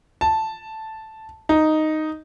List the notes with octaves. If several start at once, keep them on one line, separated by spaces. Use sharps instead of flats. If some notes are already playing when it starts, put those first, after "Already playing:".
A5
D#4